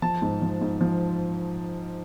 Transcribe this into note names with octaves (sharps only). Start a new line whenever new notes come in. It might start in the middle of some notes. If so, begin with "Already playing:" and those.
F3 A5
G#2
F3
G#2
F3